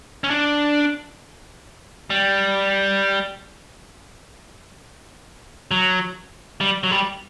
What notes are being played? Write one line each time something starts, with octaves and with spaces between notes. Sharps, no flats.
C#4
D4
G3
F#3
G3
F#3
G3